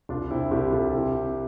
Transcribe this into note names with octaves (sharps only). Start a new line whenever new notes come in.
C2 D4 F4
C2 C4 E4
C2 E4 G4
C2 F4 A4
C3 E4 G4
C3